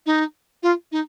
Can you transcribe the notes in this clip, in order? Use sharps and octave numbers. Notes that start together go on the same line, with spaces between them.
D#4
F4
D#4